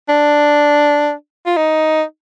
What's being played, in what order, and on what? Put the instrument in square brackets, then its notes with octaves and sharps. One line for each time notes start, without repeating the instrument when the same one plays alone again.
[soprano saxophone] D4
F4
D#4